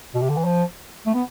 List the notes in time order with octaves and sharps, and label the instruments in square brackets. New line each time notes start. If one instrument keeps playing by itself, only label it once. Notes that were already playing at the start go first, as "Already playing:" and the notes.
[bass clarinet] B2
C3
D3
E3
F3
A3
B3